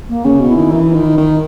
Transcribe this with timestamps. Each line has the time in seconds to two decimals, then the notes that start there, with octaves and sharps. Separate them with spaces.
0.09 A#3
0.25 C#3 C#4
0.40 B2
0.48 E4
0.56 D#3
0.71 E3 D#4
0.83 D#4
0.94 D#3 E4
1.06 E4
1.17 D#3 D#4